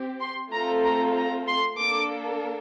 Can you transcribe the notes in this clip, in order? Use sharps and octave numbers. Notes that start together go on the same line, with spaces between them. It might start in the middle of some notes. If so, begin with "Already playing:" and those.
Already playing: C4 G4
C6
A3 C4 F4 A4 A#5
A#5
A#5
C6
A#3 D4 A4 D6